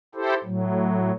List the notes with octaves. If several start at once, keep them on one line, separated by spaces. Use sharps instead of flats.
E4 G4 A4 C5
A2 F#3